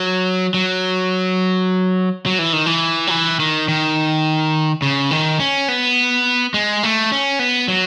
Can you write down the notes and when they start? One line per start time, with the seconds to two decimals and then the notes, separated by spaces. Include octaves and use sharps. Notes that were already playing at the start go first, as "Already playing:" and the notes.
Already playing: F#3
0.54 F#3
2.26 F#3
2.39 E3
2.53 D#3
2.66 E3
3.07 F#3
3.11 E3
3.40 D#3
3.68 D#3
4.82 C#3
5.11 D#3
5.40 C#4
5.68 B3
6.54 G#3
6.83 A3
7.12 C#4
7.39 B3
7.68 F#3